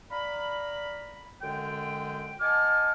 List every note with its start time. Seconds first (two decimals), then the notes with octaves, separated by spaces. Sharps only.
0.10 D5 F5 A#5 B5
1.42 F#2 D3 G#3 G5
2.40 D#5 F#5 G#5 A5 D6 F6